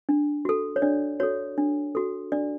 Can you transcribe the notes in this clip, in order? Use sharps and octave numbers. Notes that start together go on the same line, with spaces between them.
D4
F#4 A4
C#5
D4 D5
F#4 A4 C#5
D4
F#4 A4
D4 D5